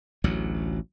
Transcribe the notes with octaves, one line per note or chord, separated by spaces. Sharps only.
A1 D2 F#3